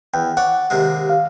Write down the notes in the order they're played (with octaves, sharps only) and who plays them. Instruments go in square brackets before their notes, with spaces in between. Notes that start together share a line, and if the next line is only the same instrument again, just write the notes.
[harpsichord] E2 [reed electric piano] G5
[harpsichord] C#5 D5 [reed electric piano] F#5
[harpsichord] D#2 C3 G#3
[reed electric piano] F5